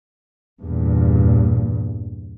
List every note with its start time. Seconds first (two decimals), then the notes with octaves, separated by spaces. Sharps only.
0.62 E2 G2 A#2